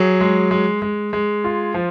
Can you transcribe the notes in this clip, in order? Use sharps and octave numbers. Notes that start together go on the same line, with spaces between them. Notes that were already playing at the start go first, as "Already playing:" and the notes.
Already playing: F#3 G#4
G#3
G#3
G#3
G#3
F4
F3